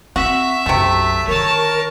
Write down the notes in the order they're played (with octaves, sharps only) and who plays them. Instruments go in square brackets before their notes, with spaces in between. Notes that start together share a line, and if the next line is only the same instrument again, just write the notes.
[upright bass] C4 [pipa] F#4 [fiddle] E5
[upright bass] B1 F#2 [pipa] C3 A3
[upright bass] D3 D#3 [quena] A#4 [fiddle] C#5 A5